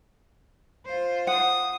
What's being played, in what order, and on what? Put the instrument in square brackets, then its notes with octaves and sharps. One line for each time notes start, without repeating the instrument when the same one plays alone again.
[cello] F4 C5
[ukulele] F#5 [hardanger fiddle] D#6